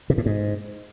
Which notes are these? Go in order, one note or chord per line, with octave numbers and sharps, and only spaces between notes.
C3
A2
G#2